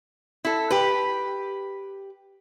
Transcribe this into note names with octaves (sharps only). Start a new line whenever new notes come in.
E4 A4
G4 B4